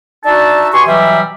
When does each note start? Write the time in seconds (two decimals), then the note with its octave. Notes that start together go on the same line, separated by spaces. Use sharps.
0.25 D4 D#4 F#4 E5 A5
0.73 B2 G4 G#5 C6 C#6
0.87 B2 E3 F#3 G3 E5